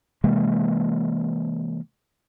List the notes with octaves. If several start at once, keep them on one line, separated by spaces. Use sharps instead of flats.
C3 E3 G#3 A#3